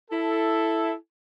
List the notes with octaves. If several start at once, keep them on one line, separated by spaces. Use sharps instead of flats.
E4 A4